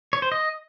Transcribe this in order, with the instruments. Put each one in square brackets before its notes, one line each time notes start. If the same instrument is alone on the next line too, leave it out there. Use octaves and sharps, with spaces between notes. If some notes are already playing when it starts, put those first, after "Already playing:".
[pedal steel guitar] C#5
C5
D#5